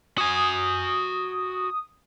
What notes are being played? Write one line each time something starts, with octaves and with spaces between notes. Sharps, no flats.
F#4 G#5 D#6